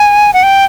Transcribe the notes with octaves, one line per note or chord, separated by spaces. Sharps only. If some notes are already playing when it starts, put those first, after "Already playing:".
Already playing: G#5
F#5
G5